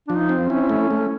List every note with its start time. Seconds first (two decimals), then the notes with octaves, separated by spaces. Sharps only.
0.08 F3 D4
0.16 D#4
0.29 C4
0.43 C#4
0.50 E4
0.69 A3
0.91 A3